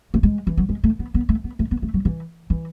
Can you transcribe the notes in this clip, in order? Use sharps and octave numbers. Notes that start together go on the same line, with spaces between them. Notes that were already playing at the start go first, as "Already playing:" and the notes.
A3
G#3
E3
F#3
G#3
A3
B3
B3
A3
B3
A3
B3
A3
F#3
E3
E3